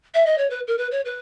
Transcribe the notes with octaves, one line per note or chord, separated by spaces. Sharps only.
E5
D#5
C#5
B4
A#4
B4
C#5
B4